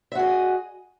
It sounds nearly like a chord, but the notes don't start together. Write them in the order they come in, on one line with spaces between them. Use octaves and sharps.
E5 F#4 G#4 D#5